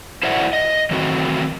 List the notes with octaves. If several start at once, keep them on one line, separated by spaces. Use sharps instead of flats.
E4 F#4 C5 D5 E5 F#5
D#5
D#3 E3 F#3 A3 C4 F#4